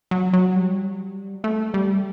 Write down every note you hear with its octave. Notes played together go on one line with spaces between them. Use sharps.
F#3
F#3
G3
A3
G3